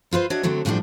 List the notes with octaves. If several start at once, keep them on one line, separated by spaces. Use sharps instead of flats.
E4 F4 B4 C5
D4 F#4 C#5 D#5 E5
D3 F#3 A3 C4
F#2 A2 F3 G3 B3 D4